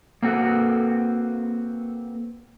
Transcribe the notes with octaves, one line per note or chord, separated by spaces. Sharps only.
A#3 C4 F#4 A4 B4